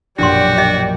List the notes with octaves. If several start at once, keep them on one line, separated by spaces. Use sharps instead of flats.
A#1 F#2 B2 D4 F#4 G4 D5 C6
D#5